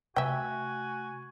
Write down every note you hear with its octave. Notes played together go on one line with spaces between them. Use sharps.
C3 A3 F#4 E5 G5 G#5